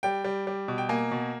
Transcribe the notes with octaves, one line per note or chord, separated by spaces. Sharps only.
G3 G5
G3
G3
B2
G5
A#3 G#5
B2